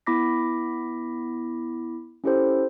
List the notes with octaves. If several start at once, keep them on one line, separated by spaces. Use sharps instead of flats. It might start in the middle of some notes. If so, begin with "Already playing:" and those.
B3 E4 B5 D6 A#6 B6
C#4 E4 G4 A4 C5